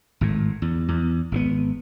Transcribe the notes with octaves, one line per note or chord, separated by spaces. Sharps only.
G#1 A2
E2
E2
G#1 C3 B3